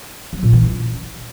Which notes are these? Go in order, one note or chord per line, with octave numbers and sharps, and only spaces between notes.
F#3
A#2
E3
C#4